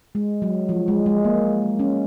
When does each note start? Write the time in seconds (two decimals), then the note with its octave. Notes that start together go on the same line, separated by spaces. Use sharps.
0.15 G#3
0.42 F#3
0.69 F3
0.88 G#3
1.06 G#3
1.25 A#3
1.79 C#4